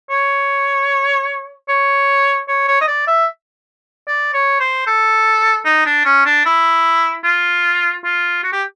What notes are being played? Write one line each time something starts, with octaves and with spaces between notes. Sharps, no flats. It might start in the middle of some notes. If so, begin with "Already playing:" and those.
C#5
C#5
C#5
C#5
D#5
D5
E5
D5
C#5
C5
A4
D#4
D4
C#4
D4
E4
F4
F4
F#4
G4